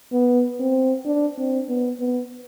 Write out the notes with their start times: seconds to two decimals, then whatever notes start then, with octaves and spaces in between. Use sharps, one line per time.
0.12 B3
0.60 C4
1.06 D4
1.38 C4
1.69 B3
2.00 B3